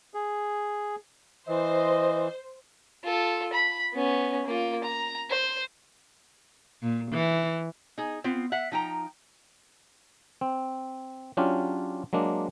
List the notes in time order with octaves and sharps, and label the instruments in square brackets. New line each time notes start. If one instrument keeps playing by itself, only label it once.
[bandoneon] G#4
[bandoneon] E3 [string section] C5 [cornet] D#5
[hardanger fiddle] F4 A4
B5
B3 C#4
A#3 F4
A#5
C5
[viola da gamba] A#2
E3
[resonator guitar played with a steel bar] D#4 G#4
B3 C4 F4
E5 F#5
F3 D#4 G5 A#5
[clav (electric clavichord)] C4
F#3 C#4 D4 F4 G4
F#3 G#3 A#3 D4